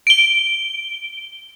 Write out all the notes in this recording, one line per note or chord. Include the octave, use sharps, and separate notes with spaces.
D7 G7